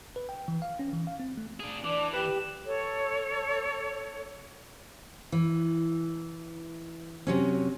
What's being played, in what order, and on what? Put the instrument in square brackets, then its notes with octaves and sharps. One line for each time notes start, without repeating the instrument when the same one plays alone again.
[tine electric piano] B4
G5
E3
F5
C#4
E3
F5
C4
A3
[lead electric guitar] D4 G#4
[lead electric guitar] E3 [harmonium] D4 [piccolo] D6
[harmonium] G4 [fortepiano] B4 [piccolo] E7
[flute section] A4 C#5
[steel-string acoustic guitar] E3
C3 F#3 C#4